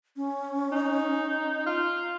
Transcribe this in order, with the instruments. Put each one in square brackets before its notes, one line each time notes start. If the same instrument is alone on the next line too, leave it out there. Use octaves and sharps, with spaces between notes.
[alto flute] C#4
[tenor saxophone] D#4
F4